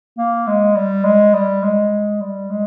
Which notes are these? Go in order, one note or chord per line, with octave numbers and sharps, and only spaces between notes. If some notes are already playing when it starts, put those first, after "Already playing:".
A#3
G#3
G3
G#3
G3
G#3
G3
G#3